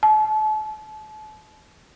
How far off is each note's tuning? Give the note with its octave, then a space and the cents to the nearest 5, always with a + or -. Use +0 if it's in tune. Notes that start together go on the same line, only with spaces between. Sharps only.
A5 -35